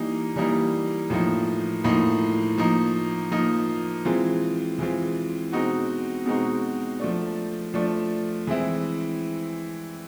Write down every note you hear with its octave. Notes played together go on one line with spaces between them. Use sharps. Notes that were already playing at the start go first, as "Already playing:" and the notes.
Already playing: E3 G3 A#3 D#4
E3 G3 A#3 D#4
A2 F3 A#3 D#4
A2 F3 A#3 D#4
F3 A#3 D#4
F3 A#3 D#4
E3 G#3 C4 F4
E3 G#3 C4 F4
B2 G#3 C4 D#4 F#4
B2 G#3 C4 D#4 F#4
F3 A3 D4
F3 A3 D4
E3 G#3 C4 E4